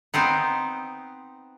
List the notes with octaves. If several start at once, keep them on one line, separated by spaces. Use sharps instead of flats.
B3 C4 D#4 C5